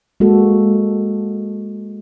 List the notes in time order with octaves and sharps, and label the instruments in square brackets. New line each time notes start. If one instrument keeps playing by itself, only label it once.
[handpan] G#3 A#3 F#4 A4